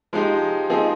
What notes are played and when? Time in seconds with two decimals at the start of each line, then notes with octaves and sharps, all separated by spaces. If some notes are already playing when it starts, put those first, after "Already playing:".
0.13 F3 G#3 D#4 G4
0.70 F3 C4 D#4 G#4